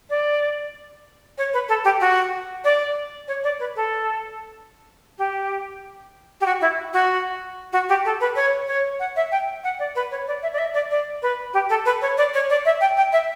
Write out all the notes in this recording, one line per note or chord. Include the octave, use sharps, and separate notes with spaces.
D5
C#5
B4
A4
G4
F#4
D5
C#5
D5
B4
A4
G4
G4
F#4
E4
F#4
F#4
G4
A4
B4
C#5
C#5
F#5
E5
G5
F#5
D5
B4
C#5
D5
E5
D5
E5
D5
D5
B4
G4
A4
B4
C#5
D5
C#5
D5
E5
G5
G5
E5